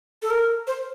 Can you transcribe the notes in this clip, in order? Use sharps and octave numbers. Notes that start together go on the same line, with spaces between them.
A4
A#4
C5